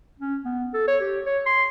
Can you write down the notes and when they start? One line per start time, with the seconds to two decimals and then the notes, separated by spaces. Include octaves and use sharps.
0.20 C#4
0.45 B3
0.74 A4
0.88 C#5
1.01 G4
1.26 C#5
1.46 C6